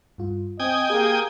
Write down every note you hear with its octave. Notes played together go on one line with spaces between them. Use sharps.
G2 F4
C4 D#5 G5 G#5 D#6
A#3 G4 G#4